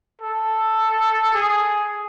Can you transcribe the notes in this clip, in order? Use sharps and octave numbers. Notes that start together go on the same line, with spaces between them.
A4
G#4